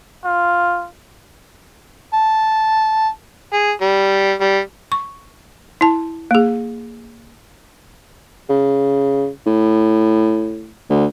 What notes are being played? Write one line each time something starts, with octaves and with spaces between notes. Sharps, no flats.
F4
A5
G#4
G3
G3
C#6
E4 A5
A#3 G#4
C#3
A2
D2